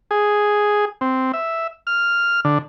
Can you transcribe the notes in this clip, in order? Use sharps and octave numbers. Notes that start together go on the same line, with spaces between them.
G#4
C4
E5
F6
D3